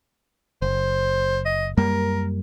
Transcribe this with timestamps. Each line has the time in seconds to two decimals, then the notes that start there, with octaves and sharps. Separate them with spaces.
0.62 F#1 C5
1.45 D#5
1.77 F#2 G3 A#3 A#4